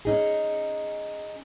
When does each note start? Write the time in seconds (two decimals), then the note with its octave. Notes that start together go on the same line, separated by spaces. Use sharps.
0.05 C#4 D#4 G#4